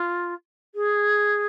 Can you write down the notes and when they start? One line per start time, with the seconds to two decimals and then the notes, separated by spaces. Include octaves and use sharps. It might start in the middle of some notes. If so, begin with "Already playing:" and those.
Already playing: F4
0.75 G#4